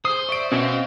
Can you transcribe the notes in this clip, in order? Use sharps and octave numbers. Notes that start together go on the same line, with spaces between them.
G#4 C5 D#6
D5 E5 C#6 D7
B2 C4 C#4 E5
C5 D#5 F5